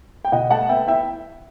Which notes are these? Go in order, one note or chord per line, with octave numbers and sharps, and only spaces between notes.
G5
B2 D#5 F#5
A3 F#5 A5
B3 E5 G5
E4 E5 G5